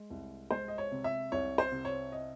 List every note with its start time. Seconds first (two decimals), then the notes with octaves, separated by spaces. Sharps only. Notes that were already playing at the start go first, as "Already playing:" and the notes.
Already playing: G#3
0.10 C2
0.51 G#3 C5
0.68 D#5
0.78 C#5
0.92 C3
1.04 E5
1.32 C2 C#5
1.58 C5
1.72 C3
1.85 C#5
2.12 D#5